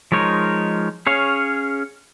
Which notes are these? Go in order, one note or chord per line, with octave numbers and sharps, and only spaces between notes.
F3 G#3 D#4 A#4 C#5
C#4 G#4 C#5 F5